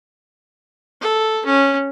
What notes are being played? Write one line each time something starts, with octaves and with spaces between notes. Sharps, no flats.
A4
C#4